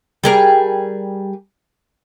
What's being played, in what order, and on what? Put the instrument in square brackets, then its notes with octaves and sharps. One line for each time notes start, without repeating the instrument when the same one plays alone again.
[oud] G3 G#4 A#4